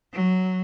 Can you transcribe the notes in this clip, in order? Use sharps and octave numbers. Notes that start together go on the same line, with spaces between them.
F#3